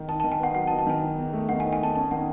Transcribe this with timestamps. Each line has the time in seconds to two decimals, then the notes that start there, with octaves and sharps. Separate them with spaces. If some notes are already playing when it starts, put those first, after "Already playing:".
Already playing: D#3
0.08 D#4 A5
0.20 D#3 A5
0.32 G#5
0.39 B3 F#5
0.55 F#3 F#5
0.67 A5
0.71 D#4
0.78 A5
0.86 D#3 G#5
1.02 D#4
1.18 E2
1.33 A3
1.49 D#3 F#5
1.60 G#5
1.65 D#4
1.73 G#5
1.80 E2 A5
1.96 C#4 A5
2.11 D#3 F#5